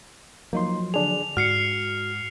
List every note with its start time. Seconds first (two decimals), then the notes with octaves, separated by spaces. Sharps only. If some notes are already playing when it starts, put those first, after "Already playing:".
0.53 F3 F#3 A#3 D#4 C6
0.94 D3 D4 G#4 F7
1.37 G#2 F#4 F6 C7 C#7